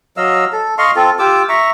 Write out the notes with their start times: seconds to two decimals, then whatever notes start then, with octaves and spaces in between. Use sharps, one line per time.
0.17 F#3 D#5 F5 E6
0.53 A4
0.78 D#5 F5 C6 C#6
0.96 C4 F4 A4
1.19 F4 G4 D6 E6
1.49 E5 A#5 C#6